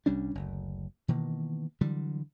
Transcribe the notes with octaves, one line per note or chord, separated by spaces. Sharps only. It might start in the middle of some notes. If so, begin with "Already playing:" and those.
C2 G3 C#4 D4
F#1 D2
B2 D#3 E3 A#3
D3 E3 F#3 G3